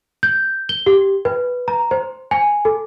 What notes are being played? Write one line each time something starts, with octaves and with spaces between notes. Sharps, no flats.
G6
G7
G4
B4
A#5
C5
G#5
A4